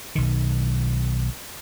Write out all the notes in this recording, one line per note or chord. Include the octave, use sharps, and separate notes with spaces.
B1 D#3